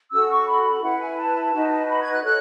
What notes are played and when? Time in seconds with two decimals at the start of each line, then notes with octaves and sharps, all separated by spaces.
0.11 C#4 F#4 A4 E6
0.29 C#6
0.47 B5
0.81 E4 B4 F#5
0.99 G#5
1.17 A5
1.53 D#4 F#4 B4
1.88 B5
1.99 G#6
2.12 F#6
2.23 F#4 A4 C#5 F#6